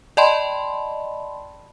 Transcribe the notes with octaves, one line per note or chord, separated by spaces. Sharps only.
D5 D#5 G5 A5 B5 C6